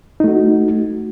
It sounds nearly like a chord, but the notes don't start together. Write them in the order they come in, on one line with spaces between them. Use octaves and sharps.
D#4 A3 F#4